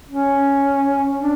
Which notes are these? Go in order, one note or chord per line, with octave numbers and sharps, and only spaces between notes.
C#4
D4